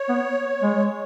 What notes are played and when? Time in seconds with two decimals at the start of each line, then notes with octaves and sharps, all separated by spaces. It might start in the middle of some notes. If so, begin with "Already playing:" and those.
Already playing: C#5
0.09 B3
0.62 G#3